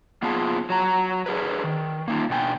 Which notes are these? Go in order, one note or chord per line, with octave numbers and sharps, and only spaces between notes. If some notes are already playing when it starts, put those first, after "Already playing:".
A#3 B3 F4 G#4 A5
F#3 A#5
D4 G#4 A#4 B4
D#3
A#3 D#4 F4
B2 D4 G5 G#5